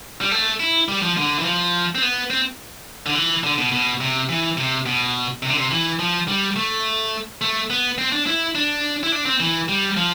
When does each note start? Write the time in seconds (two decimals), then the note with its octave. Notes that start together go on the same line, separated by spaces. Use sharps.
0.21 G3
0.31 A3
0.60 E4
0.89 G3
1.02 F3
1.17 D3
1.39 E3
1.45 F3
1.95 C4
2.02 B3
2.30 C4
3.06 D3
3.15 E3
3.44 D3
3.58 B2
3.72 B2
4.01 C3
4.29 E3
4.57 C3
4.86 B2
5.43 C3
5.50 D3
5.57 C3
5.71 E3
5.99 F3
6.28 G3
6.56 A3
7.41 A3
7.70 B3
7.98 C4
8.12 D4
8.27 E4
8.55 D4
9.03 E4
9.12 D4
9.26 C4
9.40 E3
9.69 G3
9.97 F3